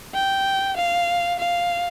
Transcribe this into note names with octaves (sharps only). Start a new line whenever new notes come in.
G5
F5
F5